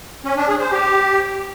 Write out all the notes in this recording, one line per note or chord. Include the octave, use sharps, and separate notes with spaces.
C#4
D4
G#4
C5
G4